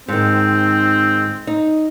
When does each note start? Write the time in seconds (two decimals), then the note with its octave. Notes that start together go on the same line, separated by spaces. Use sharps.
0.08 G#2 D#3 C4
1.47 D#4